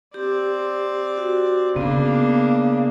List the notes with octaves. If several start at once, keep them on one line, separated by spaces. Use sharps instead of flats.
C4 G4 D5
F#4
C#3 A#3 B3 D4